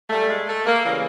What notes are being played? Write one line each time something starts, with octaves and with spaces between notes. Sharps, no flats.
A#2 G3 A3
G#3
A3
A#3
C#3 E3 G3 A#3